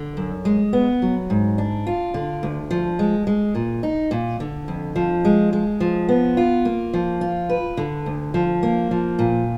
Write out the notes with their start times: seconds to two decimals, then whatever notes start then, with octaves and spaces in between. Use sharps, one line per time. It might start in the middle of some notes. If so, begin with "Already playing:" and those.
Already playing: D3
0.17 F#2
0.45 G#3
0.73 B3
1.02 F#3
1.30 G#2
1.58 D4
1.87 F4
2.14 D3
2.43 D2
2.71 F3
2.99 G#3
3.27 G#3
3.55 A#2
3.83 D#4
4.11 A#2
4.40 D3
4.68 F2
4.96 F3
5.25 G#3
5.53 G#3
5.80 F3
6.09 B3
6.37 F4
6.65 A#3
6.93 F3
7.21 F4
7.50 B4
7.77 D3
8.06 D2
8.34 F3
8.63 A#3
8.91 F3
9.19 A#2